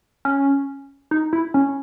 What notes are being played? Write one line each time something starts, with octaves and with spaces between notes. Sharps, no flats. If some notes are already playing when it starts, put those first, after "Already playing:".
C#4
D#4
E4
C#4